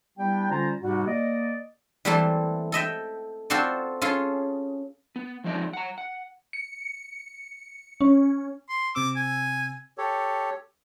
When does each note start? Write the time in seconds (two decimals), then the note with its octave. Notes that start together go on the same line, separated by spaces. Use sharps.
0.18 G3 B3 D4 E4 G4 G5
0.50 D3 G3 C#4 F4 C5 A#5
0.81 G#2 C3 G3 F#4
1.06 A#3 D5 D#5
2.05 E3 G3 A3 A#3 C4 A4
2.72 A4 D#5 E5 G5
3.50 C4 F4 F#4 A4 C5 D5
4.02 C#4 F4 G#4 A4
5.16 B3
5.44 F3 G#3 C4 D#4 D5 D#5
5.73 F#5 A#5
5.98 F#5
6.53 C#7
8.01 C#4
8.69 C6
8.95 C3 C4 D6 E6
9.16 G#5
9.98 G4 A4 C#5